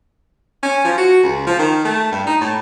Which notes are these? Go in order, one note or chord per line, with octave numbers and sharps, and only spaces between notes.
C#4
F3
F#4
C#2
F3
D#3
A3
G2
D#4
A2